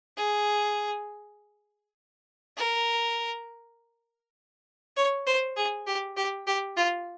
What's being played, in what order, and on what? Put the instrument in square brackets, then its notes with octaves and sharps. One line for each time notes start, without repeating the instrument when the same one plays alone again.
[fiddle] G#4
A#4
C#5
C5
G#4
G4
G4
G4
F4